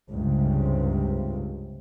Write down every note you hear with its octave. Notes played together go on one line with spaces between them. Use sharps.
C#2 G2 C3